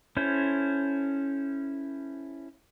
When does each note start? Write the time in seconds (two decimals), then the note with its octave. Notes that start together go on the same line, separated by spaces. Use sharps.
0.17 C#4 E4 A4 C5